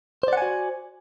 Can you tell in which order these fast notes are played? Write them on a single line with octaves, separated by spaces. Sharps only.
C5 D5 F#5 G#5 F#4